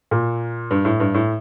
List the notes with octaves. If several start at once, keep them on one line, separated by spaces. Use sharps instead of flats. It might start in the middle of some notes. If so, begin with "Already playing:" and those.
A#2
G2
A2
G2
A2